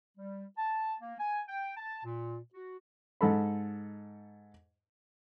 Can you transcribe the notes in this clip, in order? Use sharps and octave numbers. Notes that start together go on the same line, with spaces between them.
G3
A5
A#3
G#5
G5
A5
A#2
F#4
G#2 A4 B5